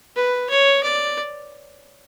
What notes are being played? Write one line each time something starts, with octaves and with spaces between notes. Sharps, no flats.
B4
C#5
D5